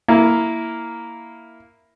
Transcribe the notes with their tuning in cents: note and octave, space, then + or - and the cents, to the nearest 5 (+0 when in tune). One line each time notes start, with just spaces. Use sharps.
A#3 +0 E4 +0